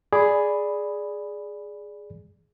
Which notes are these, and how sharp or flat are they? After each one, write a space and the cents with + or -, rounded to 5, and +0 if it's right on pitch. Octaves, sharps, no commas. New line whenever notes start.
G#4 +0 D5 +0 B5 +0